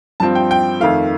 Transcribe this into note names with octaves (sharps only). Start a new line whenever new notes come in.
G2 F3 C4 F4 A5
G5
G5
F2 D#3 A3 F5